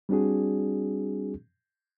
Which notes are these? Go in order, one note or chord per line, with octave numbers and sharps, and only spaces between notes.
G3 C4 D4 F#4 G#4